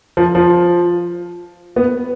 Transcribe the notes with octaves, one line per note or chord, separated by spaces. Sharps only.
F3
F3
B3